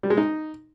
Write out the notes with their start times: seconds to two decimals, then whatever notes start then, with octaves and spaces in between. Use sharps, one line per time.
0.03 G3
0.10 G#3
0.17 D#4